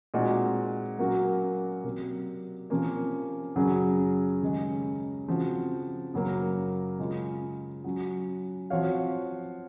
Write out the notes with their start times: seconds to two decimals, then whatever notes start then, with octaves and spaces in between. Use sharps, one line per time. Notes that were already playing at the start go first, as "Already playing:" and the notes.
0.14 A#2 G#3 C4 D#4 F#4
0.98 F#3 A#3 C#4 F#4 A#4
1.84 C3 F#3 A#3
2.70 C3 F3 A#3 C#4
3.55 F#2 C#3 F#3 C#4 G#4
4.41 D#2 C#3 G#3 C#4
5.28 C#3 F3 C4 F#4
6.14 F#2 C#3 F#3 A#3
6.99 C#3 G#3 C#4 F4
7.84 F#3 C#4 F#4
8.70 F3 C4 F#4 C#5 F5